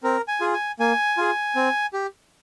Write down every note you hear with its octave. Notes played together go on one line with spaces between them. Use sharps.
C4 A#4
G#5
F4 G#4
G#5
A#3 G#5
F4 G#4
C4
G4